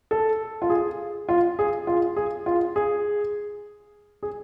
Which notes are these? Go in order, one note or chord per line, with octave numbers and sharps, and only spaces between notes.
A4
F4
G#4
F4
G#4
F4
G#4
F4
G#4
G#4